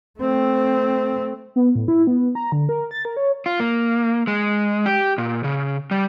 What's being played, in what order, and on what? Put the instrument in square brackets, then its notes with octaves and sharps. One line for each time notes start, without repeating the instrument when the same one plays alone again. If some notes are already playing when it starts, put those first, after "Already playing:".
[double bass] A3 C4
[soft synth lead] B3
A2
E4
B3
A#5
D3
A#4
A6
A#4
C#5
[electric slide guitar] F4
A#3
G#3
G4
A#2
C#3
G3